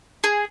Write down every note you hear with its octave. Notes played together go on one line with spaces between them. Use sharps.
G#4